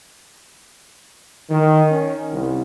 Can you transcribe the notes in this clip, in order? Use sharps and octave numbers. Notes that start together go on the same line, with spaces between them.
D#3
C#4
C2